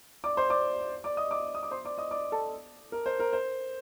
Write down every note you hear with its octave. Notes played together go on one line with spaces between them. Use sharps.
D5 D6
C5 C6
D5 D6
D5 D6
D#5 D#6
D5 D6
D#6
D6
C5 C6
D5 D6
D#5 D#6
D5 D6
A4 A5
A#4
C5
A#4
C5